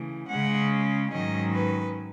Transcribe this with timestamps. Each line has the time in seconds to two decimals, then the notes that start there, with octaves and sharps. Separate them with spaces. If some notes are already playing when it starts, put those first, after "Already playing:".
Already playing: C#3 E3 A3
0.27 C#3 G#3 C#4 F#5
1.11 G#2 D#3 F#3 C#4 D#5
1.53 B4